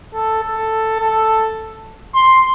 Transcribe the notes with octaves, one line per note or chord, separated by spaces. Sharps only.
A4
A4
A4
C6